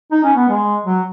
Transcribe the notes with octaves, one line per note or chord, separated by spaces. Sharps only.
D#4
C#4
B3
G#3
F#3